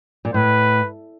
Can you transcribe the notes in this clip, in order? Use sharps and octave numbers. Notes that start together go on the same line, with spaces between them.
A#2
A2 B4